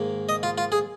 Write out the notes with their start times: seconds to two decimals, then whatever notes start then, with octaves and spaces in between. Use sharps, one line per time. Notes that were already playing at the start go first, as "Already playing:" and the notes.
Already playing: G#2 D#3 A#3
0.29 D#5
0.43 F4
0.58 F4
0.72 G#4